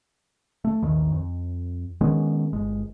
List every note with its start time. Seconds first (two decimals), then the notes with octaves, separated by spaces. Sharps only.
0.65 A3
0.83 A1 D#2 G#2 D#3
1.12 F2
2.01 D#3 G#3 B3 C#4
2.53 G1 G#3